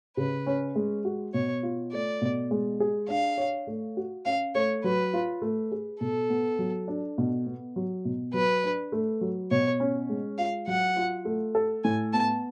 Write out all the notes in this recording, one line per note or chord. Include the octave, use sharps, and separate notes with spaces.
C#3 B4
C#4
G#3
F#4
B2 C#5
F4
A3 D5
B2
G#3
G#4
D4 F5
C#5
A3
F#4
C#4 F5
A3 C#5
F#3 B4
F4
A3
G#4
B2 A4
B3
F#3
D4
B2
B3
F#3
B2
F#3 B4
D4
A3
F#3
B2 C#5
C#4
G#3
F4 F5
F#3 F#5
F4
A3
A4
A2 G#5
B3 A5